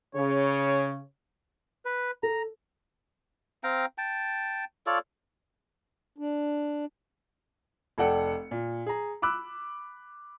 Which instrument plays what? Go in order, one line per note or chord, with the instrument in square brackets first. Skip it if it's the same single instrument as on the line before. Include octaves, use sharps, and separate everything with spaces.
[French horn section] C#3 [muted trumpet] C#5
[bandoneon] B4
[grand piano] A4 [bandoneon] A#5
[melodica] C4 F5 G5 A#5
G5 A5
F4 A4 C#5 D5
[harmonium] D4
[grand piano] F1 A4 D5 F#5 G5 C#7
A#2
G#4 A#5
B5 D6 E6 F#6